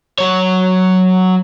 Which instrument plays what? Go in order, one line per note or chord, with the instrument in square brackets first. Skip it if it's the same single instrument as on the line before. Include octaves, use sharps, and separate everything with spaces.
[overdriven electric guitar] F#3 C#5